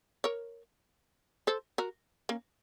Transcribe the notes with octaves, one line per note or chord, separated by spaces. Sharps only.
A#4 C#5
A4 C5
F#4 A#4
A#3 C#4